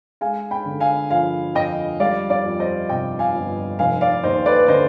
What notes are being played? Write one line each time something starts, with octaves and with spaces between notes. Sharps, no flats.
G#3 F5 G#5
G5 B5
D3
F5 G#5
F3 F5 G#5
F2 D#5 G5
G3 D5 F5
D5 F5
F2
C5 D#5
C3 D#5 G5
F5 G#5
G1
F1 F5 G#5
D5 F5
D#2 C5 D#5
B4 D5
D3 C5 D#5